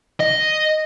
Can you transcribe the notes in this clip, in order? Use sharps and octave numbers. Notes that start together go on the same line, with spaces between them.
D#5